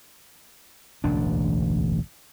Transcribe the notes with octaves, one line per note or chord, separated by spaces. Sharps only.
E1 A1 D2 D4